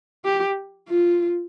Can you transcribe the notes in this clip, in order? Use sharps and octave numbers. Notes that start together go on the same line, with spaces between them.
G4
F4